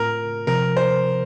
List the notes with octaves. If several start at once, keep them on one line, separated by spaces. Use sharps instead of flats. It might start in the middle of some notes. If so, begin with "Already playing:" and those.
Already playing: A2 A3 C4 F4 A#4
C3 F3 C4 A#4
C5